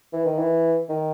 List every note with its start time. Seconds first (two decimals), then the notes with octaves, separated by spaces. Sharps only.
0.13 E3
0.26 D#3
0.39 E3
0.89 D#3